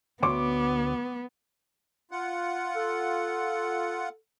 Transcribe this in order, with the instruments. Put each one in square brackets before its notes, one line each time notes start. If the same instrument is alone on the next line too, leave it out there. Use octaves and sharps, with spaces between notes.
[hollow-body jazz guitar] D2 C#5 C6 [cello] B3 [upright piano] D6
[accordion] F4 F#5
[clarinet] A4